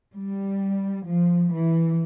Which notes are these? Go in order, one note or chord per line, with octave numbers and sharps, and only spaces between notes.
G3
F3
E3